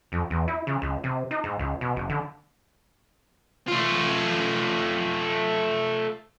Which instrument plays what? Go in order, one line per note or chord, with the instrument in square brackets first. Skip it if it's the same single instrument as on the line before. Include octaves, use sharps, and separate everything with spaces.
[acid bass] F2
E2
E4
C#3
C#2
C3
D#4
G#2
C#2
B2
F#1
D3
[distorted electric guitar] A3 F4